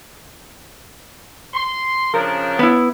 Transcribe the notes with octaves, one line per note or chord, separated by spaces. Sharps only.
C6
C#3 F3 D4 A#4
B3 E4